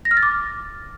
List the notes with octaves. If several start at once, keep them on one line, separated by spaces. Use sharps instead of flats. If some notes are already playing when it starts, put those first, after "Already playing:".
A#6
F6
A6
D6